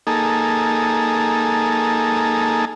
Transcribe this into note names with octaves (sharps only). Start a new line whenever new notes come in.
A#3 D#4 G#4 A4